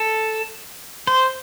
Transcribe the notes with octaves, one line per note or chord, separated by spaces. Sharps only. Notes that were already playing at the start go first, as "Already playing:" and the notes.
Already playing: A4
C5